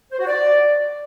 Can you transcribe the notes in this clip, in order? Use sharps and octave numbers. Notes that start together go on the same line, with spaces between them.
C5
F#4
D5